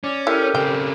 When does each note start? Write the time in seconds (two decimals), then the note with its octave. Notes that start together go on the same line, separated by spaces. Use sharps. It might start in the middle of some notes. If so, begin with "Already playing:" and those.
0.04 C#4 D5
0.27 E4 G4 A4 A#4 D5
0.55 C#3 C4 G5